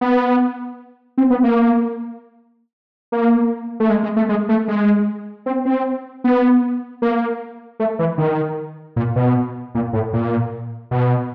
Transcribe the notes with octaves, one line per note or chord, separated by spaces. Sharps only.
B3
C4
B3
A#3
A#3
A3
G#3
G#3
A3
G#3
A3
G#3
C4
C4
B3
A#3
A3
E3
D#3
A#2
B2
A#2
A2
A#2
B2